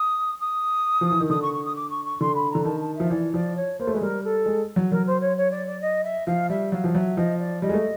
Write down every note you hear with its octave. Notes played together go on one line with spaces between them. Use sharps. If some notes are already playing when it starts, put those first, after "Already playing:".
Already playing: D#6
D#6
F3
E3
D#3
D3 D#6
C#6
C#6
D#6
D6
C#6
C#6
D3 C6
B5
D3 A#5
D#3 A5
A5
F3 E5
E3 D5
F3 D5
C#5
A#3 C5
A3
G#3 B4
G3 A#4
A4
G#3
F#3
F#3 A#4
C5
C#5
C#5
D5
D5
D#5
E5
F3 F5
G3 E5
F#3 F5
F3
F#3 E5
F3 D#5
D5
G3 D#5
G#3
A3